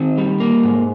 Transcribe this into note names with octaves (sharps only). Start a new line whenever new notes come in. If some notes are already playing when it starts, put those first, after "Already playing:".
Already playing: D#3 C4
G3
A#3
G#2